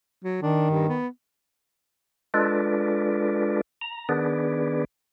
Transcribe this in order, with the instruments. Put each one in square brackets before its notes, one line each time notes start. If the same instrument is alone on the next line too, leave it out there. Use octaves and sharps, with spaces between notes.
[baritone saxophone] F#3
[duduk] D#3 [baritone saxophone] D4
[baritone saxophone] G2
B3
[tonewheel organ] G#3 D4 F4 A4 B4 D5
A#5
D#3 B3 D4 G#4 B4 D5